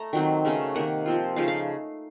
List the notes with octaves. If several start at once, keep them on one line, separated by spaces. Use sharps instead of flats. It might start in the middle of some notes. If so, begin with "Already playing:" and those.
Already playing: A3 A#5
D#3 F#3 C4
C#3 F#3 A3 C#4
C3 D#3 A#3 F#5
F3 C4 F4
C#3 F3 A3 D#4 F5
F5